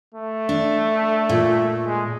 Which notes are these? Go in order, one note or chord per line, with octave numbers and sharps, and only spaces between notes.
A3
D4
A#2
G#3